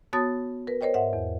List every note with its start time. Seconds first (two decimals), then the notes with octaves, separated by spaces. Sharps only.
0.13 B3 F#4 C#5 A5 D#6 A6
0.67 A#4 B4
0.81 A#4 C5 C#5 D#5 G5
0.94 G#2 E5 F#5
1.13 E2